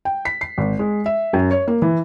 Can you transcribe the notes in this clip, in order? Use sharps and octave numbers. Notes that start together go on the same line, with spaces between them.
G5
B6
C7
G#1
G#3
E5
F#2
C#5
A#3
E3